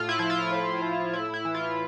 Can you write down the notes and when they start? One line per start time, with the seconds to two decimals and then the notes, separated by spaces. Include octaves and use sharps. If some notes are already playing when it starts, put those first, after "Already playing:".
Already playing: A2 F4
0.09 E4
0.19 F3 E4
0.30 F4
0.51 A2
0.81 F3
1.13 A2 E4
1.34 E4
1.45 E3
1.55 F4